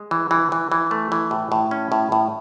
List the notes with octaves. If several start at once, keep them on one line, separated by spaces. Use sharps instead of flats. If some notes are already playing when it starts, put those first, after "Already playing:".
Already playing: G#3
E3
E3
E3
E3
A3
E3
A2
A2
C#4
A2
A2